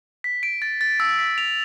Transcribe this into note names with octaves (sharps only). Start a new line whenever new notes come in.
B6
D7
A6
A6
E6
B6
F7